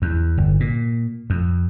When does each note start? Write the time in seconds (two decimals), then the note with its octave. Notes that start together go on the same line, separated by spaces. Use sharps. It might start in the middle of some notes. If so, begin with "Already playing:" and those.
0.02 E2
0.38 G1
0.60 A#2
1.30 F2